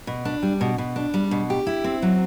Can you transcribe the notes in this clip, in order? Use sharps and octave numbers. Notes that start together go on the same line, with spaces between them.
B2
D4
G3
B2
B2
D4
G3
B2
G4
E4
C4
F#3